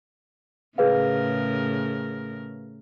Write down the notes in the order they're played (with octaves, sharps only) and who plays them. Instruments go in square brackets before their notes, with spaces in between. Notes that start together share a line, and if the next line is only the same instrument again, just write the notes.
[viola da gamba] A2 C#3 A#4 [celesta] G#4 B4 F5